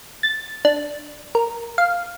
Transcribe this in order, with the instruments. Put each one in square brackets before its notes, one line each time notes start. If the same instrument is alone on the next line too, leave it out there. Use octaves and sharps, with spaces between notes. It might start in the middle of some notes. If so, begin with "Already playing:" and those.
[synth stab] A6
D4
A#4
F5